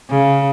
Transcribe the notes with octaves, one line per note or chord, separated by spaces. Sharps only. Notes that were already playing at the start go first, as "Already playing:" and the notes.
C#3